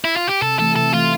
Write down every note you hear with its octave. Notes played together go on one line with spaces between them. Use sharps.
E4
F4
G4
C3 A4
E3 A3 A4
C3 A4
E3 A3 F4